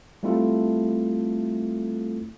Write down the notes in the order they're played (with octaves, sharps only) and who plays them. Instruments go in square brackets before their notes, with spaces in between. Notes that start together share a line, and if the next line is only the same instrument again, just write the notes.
[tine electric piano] G3 A3 C4 E4 F4 A4